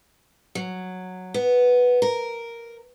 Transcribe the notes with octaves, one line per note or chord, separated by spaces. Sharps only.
F#3
B3
A#4